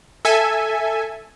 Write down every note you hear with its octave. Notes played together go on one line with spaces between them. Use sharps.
A4 E5 G#5